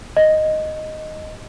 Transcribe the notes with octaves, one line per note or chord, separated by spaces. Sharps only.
D#5